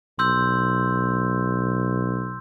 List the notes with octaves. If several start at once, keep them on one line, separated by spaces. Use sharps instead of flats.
B1 C6 E6 G6